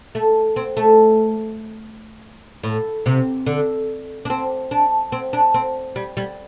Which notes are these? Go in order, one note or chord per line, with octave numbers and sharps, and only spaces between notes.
A3
C4
A3
A2
C3
D3
D4
C4
D4
C4
D4
C4
G3
G3